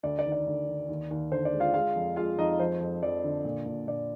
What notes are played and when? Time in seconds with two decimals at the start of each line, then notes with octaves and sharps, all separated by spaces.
0.03 D2 D5
0.19 D5
0.26 D#3
0.32 D5
0.46 D2
0.68 D#3
0.89 D#2
1.11 D#2
1.32 D3 C5
1.45 D5
1.52 G#3
1.60 F4 F5
1.74 G#3 F4 F5
1.95 F2
2.16 G#3 F4 F5
2.38 F2 D#4 D#5
2.60 F3 C5
2.80 F2
3.02 F2 D5
3.24 D3
3.45 A#2
3.66 A#2
3.87 A#2 D5